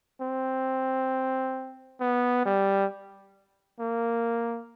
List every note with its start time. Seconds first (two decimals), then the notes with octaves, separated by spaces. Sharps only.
0.21 C4
2.00 B3
2.45 G3
3.80 A#3